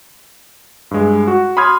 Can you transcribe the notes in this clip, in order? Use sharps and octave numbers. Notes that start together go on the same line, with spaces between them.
G2 G#3
F#4
B5 C6 D#6 F6 G#6